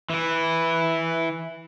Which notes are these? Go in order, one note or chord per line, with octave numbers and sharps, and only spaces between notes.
E3 E4